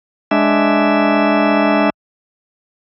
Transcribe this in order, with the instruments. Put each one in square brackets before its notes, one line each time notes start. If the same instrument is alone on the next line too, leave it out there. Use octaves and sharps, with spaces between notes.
[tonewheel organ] G#3 D4 E5